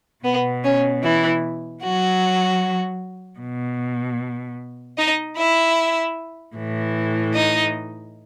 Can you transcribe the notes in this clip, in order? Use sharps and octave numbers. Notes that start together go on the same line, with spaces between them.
B2 B3
C#4
E3 E4
F#3 F#4
B2
D#4 D#5
E4 E5
A2 E3
D#4 D#5